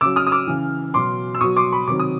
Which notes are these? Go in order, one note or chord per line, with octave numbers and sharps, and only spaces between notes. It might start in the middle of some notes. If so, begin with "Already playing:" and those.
C#3 F#3 D6 E6
D#6 F6
D#6
D6 E6
C#3 E3
B2 F#3 C6 D6
E6
B2 F#3 C#6 D#6
C6 D6
B5 C#6
C3 D#3 F#3 D6
D#6